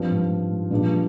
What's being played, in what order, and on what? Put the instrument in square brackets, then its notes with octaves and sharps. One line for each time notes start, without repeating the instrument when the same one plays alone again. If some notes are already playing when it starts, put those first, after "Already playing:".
Already playing: [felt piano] G2 F3 C4 F4
[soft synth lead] G#2
G#2
G#2
[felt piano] G2 F3 G#3 D4 [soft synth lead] A#2